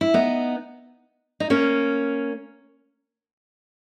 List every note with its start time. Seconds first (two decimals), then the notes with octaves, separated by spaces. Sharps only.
0.01 E4
0.14 B3 D#4
1.40 D#4
1.50 A#3 C#4